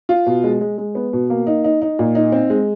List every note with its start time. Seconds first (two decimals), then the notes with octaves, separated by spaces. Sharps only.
0.09 F4
0.26 B2
0.44 G#3
0.61 G#3
0.78 G#3
0.95 B3
1.13 B2
1.30 A#3
1.47 D#4
1.64 D#4
1.82 D#4
1.99 A#2
2.15 D#4
2.32 C4
2.50 G#3